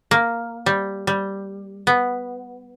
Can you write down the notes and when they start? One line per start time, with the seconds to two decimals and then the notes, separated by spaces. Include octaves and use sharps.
0.11 A#3
0.66 G3
1.07 G3
1.87 B3